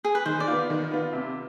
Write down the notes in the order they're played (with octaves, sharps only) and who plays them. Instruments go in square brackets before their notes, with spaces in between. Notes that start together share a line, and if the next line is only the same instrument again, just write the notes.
[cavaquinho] G#4
B4
[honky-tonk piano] D#3 [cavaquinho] C5
[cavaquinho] D5
[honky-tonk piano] B3 F4
D#3
B3 F4
C3